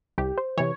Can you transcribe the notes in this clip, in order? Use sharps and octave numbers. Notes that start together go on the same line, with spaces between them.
C2 G4
C5
C3 E3 C#5